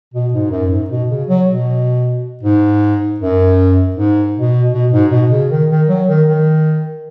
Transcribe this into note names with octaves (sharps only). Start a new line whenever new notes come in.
B2
G#2
F#2
G#2
B2
C#3
F#3
B2
G#2
F#2
G#2
B2
B2
G#2
B2
C#3
D#3
D#3
F#3
D#3
D#3